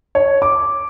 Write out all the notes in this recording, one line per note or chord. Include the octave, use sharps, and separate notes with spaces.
C#5
D6